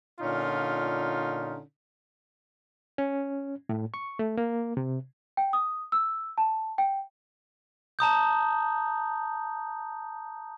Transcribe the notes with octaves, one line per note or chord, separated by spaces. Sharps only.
A#2 D3 C#4 D#4 F4
C#4
A2
C#6
A3
A#3
C3
G5
D#6
E6
A5
G5
A5 A#5 D#6 G6